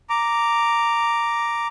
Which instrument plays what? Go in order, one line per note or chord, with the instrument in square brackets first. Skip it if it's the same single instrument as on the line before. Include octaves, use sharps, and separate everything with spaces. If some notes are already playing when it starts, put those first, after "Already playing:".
[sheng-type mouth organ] A#5 D6